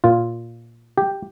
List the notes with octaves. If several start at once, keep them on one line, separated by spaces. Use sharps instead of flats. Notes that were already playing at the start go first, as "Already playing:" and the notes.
A#2 F4
G4